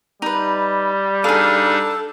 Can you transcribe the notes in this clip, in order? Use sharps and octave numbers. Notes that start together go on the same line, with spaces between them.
G3 D#4 B4
D4 D#4 G#4 A4 F5